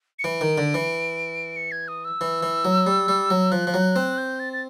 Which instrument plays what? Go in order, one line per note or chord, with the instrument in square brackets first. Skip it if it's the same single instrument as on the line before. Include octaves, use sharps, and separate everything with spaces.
[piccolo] C#7
[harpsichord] E3 [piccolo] D7
[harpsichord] D#3
D3
E3
[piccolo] C#7
G#6
D#6
E6
[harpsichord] E3
E3
F#3
G3
G3
F#3
[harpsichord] F3 [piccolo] F#6
[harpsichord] F3
F#3
C4
[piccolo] G6
A6
A6